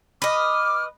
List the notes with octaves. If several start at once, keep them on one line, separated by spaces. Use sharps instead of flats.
B4 D#5 D6 F6